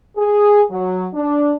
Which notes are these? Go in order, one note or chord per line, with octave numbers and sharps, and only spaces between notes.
G#4
F#3
D4